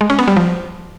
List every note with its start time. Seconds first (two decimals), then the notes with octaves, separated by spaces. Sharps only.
0.01 G#3
0.10 C#4
0.19 B3
0.28 G3
0.37 F3